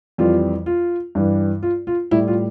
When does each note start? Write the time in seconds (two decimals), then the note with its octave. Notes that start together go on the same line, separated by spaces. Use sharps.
0.18 F2 E3 G3 F4
0.66 F4
1.15 G2 E3 G3
1.63 F4
1.87 F4
2.11 A2 G3 E4
2.28 F4